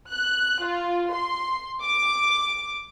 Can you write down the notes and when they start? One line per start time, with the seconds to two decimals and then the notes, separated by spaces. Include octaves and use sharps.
0.11 F#6
0.63 F4
1.12 C6
1.82 D6